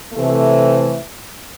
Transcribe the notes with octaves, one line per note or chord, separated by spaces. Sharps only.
C3 E3 A3